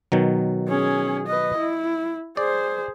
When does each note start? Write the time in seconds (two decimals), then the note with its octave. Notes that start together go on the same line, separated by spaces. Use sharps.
0.12 B2 D#3 F#3
0.68 C#4 G#4
1.27 B4 D#5
1.57 E4
2.37 G#4 C5 D5